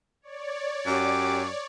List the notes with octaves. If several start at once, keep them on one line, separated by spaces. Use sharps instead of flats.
C#5 D5
F#2 G4 D6